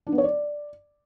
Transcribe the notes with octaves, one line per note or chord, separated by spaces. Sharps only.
D4
B3
C#5
D5